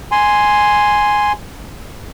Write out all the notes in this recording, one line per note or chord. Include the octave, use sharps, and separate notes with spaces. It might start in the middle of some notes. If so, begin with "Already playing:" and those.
G#5 C6